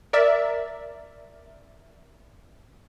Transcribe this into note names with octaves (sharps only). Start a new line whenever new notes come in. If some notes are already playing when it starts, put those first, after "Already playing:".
A#4 D5 E5